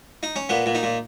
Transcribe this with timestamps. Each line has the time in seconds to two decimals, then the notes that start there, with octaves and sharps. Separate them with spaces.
0.23 D#4
0.36 C#4
0.49 A#2 B3
0.66 A#2
0.75 D#4
0.83 A#2